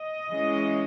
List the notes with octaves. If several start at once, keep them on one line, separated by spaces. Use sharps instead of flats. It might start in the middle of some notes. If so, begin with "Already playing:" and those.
Already playing: D#5
E3 G#3 C#4